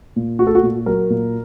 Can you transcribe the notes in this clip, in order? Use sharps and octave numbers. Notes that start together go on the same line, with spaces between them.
A#2
A3 F#4
A4
F#4
A#2
F#3 A#4
A#2